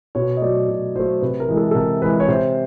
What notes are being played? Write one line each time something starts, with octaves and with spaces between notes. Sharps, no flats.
B2 C#5
D#5
F#3 A3 D5
B2
F#3 A3 C5
C3 B4
A#4
E3 G#3
A4
A4
C3 A#4
E3 G#3 B4
C#5
C3 C5